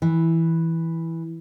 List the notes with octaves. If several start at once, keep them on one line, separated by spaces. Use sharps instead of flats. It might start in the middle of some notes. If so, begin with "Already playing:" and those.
E3